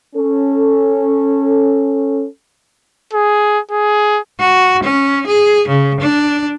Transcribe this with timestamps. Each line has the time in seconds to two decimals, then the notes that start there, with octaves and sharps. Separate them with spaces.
0.16 C#4 A4
3.13 G#4
3.71 G#4
4.40 F#4
4.83 C#4
5.27 G#4
5.68 C#3
6.01 D4